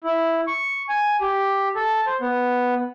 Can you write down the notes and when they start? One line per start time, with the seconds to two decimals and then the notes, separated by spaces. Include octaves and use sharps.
0.04 E4
0.47 C#6
0.89 G#5
1.21 G4
1.75 A4
2.07 C5
2.21 B3